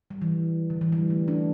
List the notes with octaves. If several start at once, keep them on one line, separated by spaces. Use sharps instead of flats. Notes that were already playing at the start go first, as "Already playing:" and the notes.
G3
E3
D3
E3
G3
A3
D4